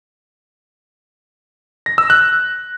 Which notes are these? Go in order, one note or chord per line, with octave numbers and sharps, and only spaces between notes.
A#6
E6
F#6